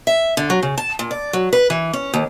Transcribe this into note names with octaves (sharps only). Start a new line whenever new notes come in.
E5
D3
F#3
C#3
A5
A#2
D5
F#3
B4
E3
C#4
D#2